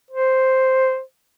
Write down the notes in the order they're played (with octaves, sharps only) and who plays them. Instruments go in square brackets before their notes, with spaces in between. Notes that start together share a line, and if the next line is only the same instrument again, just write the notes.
[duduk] C5